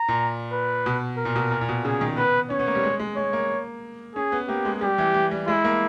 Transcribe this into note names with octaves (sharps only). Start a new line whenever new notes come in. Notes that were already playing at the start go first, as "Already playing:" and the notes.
Already playing: A#5
A#2
B4
B2
A#4
A#2
B2
A#2
A#2
B2
C#3 G#4
D#3
B3 B4
C#4 C#5
B3
A#3
G3
G#3
G#3
G#3 C#5
A#3
C#4 G#4
B3
A#3 G4
G#3
G3 G4
E3
E3
G3
G#3 E4
A#3